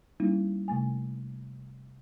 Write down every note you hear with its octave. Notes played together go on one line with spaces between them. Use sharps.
G3 A#3 C#4 D#4 E4
C3 A3 G#5